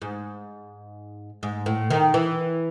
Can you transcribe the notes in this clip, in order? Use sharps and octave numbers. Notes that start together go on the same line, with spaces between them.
G#2
G#2
A2
D#3
E3